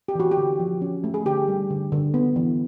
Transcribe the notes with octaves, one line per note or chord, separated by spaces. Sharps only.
G4
E3 F#4
G4
D3
F3
C#4
A3
G#4
D3 G4
G3
D3
D3
B3
E3